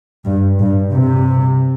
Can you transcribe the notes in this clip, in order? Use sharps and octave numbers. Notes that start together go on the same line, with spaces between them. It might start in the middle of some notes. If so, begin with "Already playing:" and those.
G2
G2
C3